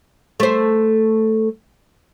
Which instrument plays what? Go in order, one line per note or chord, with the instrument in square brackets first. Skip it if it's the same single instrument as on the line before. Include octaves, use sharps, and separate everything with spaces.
[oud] A3 C5